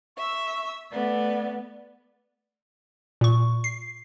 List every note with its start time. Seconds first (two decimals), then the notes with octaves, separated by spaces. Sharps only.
0.17 E5 C#6 E6
0.92 A3 B3 D5
3.21 A#2 C#6
3.64 C7